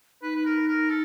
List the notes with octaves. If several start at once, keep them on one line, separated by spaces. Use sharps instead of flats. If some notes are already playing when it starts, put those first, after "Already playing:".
D#4 B4
B4
A#4
A#4
A4